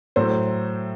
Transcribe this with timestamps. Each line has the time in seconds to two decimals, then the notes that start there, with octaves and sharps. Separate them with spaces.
0.16 A2 F#3 A3 C5